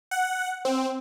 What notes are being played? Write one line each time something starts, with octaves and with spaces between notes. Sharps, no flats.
F#5
C4